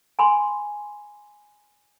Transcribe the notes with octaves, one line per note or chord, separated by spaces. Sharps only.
G#5 B5 C6